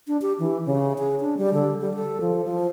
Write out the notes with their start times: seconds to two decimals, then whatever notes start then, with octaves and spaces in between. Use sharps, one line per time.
0.07 D4
0.22 G4
0.39 E3
0.66 C#3
0.99 G#4
1.21 D4
1.37 G3
1.54 D3
1.81 G3
1.94 A4
2.21 F3
2.45 F3